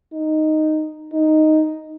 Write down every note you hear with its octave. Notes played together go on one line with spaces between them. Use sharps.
D#4
D#4